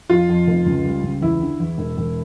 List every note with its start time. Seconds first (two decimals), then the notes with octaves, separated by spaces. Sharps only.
0.10 F2 F4
0.29 F2
0.47 F1
0.66 C#2
0.84 G3
1.03 C#2
1.21 E2 E4
1.41 D3
1.60 E2
1.78 E1
1.97 E1